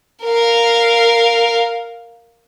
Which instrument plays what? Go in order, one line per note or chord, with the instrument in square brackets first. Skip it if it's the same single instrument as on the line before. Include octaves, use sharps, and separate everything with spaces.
[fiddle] A#4 F5